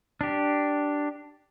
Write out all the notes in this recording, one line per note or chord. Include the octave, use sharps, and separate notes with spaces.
D4 G4